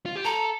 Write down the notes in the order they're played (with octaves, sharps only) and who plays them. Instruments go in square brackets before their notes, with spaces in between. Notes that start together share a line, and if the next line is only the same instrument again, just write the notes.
[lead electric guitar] F4
G4
[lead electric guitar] A4 [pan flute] A#5